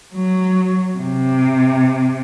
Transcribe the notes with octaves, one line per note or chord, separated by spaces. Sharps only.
F#3
C3